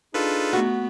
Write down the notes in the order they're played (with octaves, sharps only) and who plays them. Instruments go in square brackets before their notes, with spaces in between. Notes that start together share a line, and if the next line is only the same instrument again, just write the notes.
[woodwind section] D4 D#4 G#4 [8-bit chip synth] F4 A4 B4
[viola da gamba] A3 B3 [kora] F#4